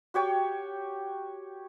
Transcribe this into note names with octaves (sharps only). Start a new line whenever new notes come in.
F#4 G4 C#5 G5